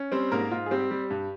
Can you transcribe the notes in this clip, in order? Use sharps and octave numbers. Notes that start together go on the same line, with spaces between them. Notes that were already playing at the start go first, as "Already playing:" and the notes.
Already playing: C#4
G3 C4 C5
G#2 A#3 A#4
G#2 F4
G#4
G3 C4 G4
G3
G2